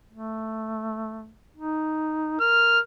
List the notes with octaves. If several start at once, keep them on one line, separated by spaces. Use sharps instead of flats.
A3
D#4
A#4 F6